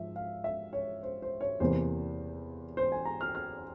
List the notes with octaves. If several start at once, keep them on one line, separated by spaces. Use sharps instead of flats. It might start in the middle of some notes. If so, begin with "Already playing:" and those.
Already playing: G#2 F3 E5
F5
E5
C#5
C5
C5
C#5
E2 C3 E3 A#3 C5
C5
G#5
A#5
F6
F6